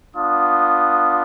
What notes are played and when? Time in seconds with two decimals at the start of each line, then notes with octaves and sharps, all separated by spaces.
0.16 B3 D4 F4 D#6